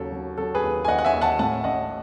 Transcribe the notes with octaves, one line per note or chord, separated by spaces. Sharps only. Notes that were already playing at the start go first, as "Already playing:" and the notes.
Already playing: D#2 C#3 F#3 A4
F#3
F#3 A4
G#4 B4
D#2
G#5
D#2 D#5 F#5
F#5
E5 G#5
D#2
F#5 A5
A2 F#5 A5
A1 D#5 F#5